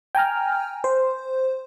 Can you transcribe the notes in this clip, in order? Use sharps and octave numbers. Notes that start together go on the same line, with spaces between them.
G5 G#5 A#5 F6
C5